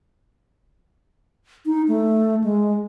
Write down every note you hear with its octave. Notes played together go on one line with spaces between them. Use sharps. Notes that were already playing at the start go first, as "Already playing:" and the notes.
D#4
A3
G#3